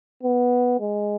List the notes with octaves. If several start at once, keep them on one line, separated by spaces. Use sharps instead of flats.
B3
G#3